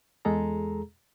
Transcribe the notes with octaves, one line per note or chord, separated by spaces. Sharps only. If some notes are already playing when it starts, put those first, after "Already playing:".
E2 G#3 G#4 A4 A#5